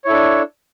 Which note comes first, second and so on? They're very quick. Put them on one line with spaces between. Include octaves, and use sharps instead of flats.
C#5 E4 A4 D4